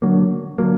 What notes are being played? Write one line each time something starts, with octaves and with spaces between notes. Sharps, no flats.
D3 F#3 A#3
D3 F#3 A#3